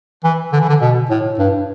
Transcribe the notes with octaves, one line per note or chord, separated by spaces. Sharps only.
E3
D3
E3
D3
B2
A2
G2